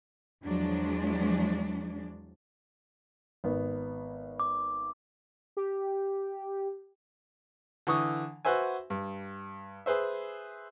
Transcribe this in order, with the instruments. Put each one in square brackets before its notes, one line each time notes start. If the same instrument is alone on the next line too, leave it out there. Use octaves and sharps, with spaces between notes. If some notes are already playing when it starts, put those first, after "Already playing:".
[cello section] E2 F3 F#3 G#3 D4
[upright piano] G#1 B3
[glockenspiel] D6
[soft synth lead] G4
[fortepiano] D3 E3 C#6 D#6
F#4 B4 C5 E5 G#5
G2
G#4 B4 C5 E5